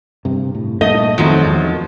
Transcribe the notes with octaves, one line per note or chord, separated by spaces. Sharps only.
G2 C3
A2
G2 A#2 A3 D#5
G#1 F2 D#3 F3 F#3 A3
E2 G#3